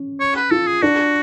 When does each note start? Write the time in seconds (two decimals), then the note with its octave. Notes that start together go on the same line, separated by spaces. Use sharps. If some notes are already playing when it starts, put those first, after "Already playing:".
Already playing: C#4
0.20 C#5
0.36 B4
0.51 F4 A4
0.67 G#4
0.82 D4 F#4